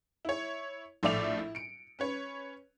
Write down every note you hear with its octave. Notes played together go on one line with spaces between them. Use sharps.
E4 C#5
A#1 A2 A4 D5 E5 F7
E4
C#7 D7
C#4 B4 C#5